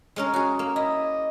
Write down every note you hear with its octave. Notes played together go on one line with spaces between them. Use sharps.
G#3 C#4 A#4
F#4 G#4
A#3
E4 D#5